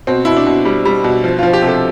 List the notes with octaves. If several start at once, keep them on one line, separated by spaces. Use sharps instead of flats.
B2 C4
B2 E4
D4
B2
G3
G3
B2
F3
F3 F4
G4
C3
A4